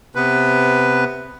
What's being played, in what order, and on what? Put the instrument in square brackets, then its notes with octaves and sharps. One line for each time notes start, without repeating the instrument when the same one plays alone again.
[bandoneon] C3 B3 B4